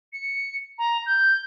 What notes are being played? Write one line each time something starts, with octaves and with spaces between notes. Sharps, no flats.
C#7
A#5
G6